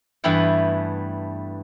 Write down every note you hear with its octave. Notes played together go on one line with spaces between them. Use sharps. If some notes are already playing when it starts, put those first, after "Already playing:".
G2 E3 A3 B3 E4 G5